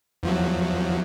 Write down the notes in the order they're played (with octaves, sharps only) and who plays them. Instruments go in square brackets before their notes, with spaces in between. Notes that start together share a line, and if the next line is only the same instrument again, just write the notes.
[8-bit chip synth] E2 F3 F#3